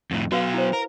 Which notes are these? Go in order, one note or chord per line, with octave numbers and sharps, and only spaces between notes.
F2 A2
F#3 B3 F#4 B4 F5
E4 C5
A#4